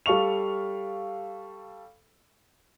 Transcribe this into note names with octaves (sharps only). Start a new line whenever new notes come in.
G3 A4 F5 C#6 F7